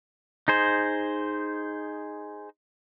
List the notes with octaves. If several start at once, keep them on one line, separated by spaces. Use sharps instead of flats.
D#4 G#4 C5